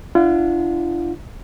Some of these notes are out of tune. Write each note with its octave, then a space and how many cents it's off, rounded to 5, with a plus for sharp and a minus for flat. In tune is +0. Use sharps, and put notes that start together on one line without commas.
D4 +15 F4 -40 F#5 -40